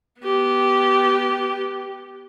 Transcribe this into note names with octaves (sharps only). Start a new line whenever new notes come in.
B3 G4